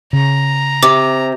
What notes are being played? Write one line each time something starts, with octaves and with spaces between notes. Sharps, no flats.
C#3 A#5
C3 D6